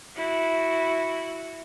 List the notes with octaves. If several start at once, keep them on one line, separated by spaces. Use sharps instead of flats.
E4 F#4